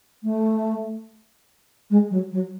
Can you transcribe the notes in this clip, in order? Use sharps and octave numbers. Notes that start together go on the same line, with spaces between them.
A3
G#3
F#3
F#3